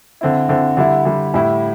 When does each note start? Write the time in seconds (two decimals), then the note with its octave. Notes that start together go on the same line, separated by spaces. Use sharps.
0.21 D3 C4 E4
0.49 D3 C4 E4
0.77 D3 G3 E4
1.05 D3 G3 E4
1.34 A2 G3 E4